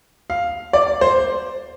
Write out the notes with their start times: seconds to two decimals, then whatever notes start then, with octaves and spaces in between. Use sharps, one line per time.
0.30 F5
0.73 D5
1.01 C5